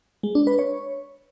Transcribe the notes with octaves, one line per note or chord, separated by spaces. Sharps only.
G#3
D4
B4
C#5